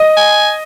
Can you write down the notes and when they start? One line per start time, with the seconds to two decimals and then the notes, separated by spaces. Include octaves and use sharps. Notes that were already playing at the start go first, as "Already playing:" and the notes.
Already playing: D#5
0.17 G#5